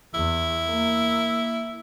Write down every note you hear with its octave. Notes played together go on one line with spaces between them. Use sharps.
E2 E4
A#3